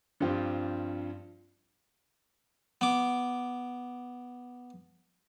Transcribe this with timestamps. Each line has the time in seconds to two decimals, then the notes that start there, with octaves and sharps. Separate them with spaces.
0.20 G2 F3 C4 F4 G4
2.81 B3 D6